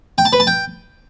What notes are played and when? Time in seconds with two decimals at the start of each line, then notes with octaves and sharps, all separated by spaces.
0.18 G5
0.25 A5
0.33 B4
0.40 A5
0.47 G5